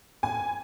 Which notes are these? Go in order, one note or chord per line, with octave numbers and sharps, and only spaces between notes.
G#5